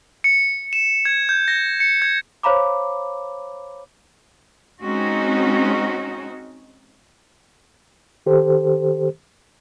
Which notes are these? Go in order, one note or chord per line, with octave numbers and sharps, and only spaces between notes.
C#7
E7
G#6
G6
A#6
C#7
G#6
C5 C#5 F5 A#5 B5 D6
G#3 C4 C#4 D#4 F#4
D#3 G4 A4 C5